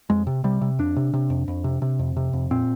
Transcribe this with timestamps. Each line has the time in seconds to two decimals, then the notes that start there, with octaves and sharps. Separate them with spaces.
0.10 F2 G#3
0.27 C3
0.44 C3 G3
0.61 C3
0.79 F2 D4
0.96 C3
1.14 C3
1.30 F2
1.48 F2
1.64 C3
1.82 C3
1.99 F2
2.17 C3
2.33 F2
2.51 A#2 C4